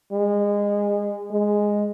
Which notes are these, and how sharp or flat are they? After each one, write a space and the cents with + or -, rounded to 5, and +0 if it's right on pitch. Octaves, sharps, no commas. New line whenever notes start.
G#3 -25
G#3 -5